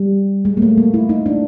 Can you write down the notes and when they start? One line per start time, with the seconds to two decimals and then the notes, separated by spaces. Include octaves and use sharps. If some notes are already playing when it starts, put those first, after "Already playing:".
Already playing: G3
0.45 G#3
0.57 A#3
0.62 A3
0.78 A#3
0.94 E4
1.09 D#4
1.26 D4